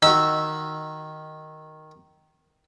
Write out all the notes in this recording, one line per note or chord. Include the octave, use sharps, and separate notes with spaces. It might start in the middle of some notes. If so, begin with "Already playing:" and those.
D#3 F#4 D#5 E6